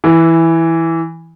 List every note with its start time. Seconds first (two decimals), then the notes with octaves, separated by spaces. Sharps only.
0.04 E3